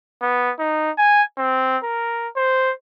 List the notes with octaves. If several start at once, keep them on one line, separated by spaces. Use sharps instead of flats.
B3
D#4
G#5
C4
A#4
C5